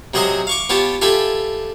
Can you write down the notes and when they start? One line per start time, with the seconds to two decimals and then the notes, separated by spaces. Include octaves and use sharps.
0.14 C3 F#3 G#4 C5 D#5 D#6
0.47 F5 C#6 D6
0.69 B3 F4 G4 C#5 A5
1.02 F4 G4 A4 E5 G#5 B5